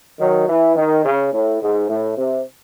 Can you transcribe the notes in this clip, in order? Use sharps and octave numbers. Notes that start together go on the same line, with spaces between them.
D#3 F#3
E3
D#3
C#3
A2
G#2
A2
C3